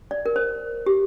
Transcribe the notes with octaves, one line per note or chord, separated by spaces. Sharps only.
D5
A#4
C5
G4